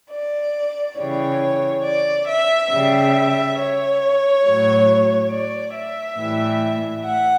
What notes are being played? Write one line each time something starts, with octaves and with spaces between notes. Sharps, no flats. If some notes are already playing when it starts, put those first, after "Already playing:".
D5
C#3 E3 G3 C#5
D5
E5
C#3 G3 E5
C#5
A2 F#3
D5
E5
A2 E3 G3
F#5